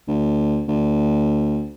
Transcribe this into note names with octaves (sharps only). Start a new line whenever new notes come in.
D2
D2